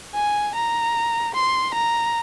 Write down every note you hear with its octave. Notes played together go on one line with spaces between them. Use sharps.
G#5
A#5
C6
A#5